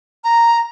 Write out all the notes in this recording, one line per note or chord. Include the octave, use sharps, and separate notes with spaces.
A#5